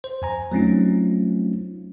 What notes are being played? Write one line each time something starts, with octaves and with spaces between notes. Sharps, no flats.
C5
F2 G#5 A#5
F#3 A3 C4 C#4 D#4 F4